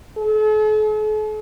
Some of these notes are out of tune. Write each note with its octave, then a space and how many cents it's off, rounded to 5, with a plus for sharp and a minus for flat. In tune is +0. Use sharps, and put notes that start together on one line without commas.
A4 -45